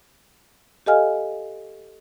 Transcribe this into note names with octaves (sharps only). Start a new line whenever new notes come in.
G4 A4 D#5 F5 G#5 F6